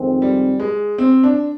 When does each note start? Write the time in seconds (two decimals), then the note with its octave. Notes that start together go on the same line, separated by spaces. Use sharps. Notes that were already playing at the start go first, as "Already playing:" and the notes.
Already playing: F2 D#3 G#3 C4
0.22 G3
0.60 G#3
0.98 C4
1.24 D4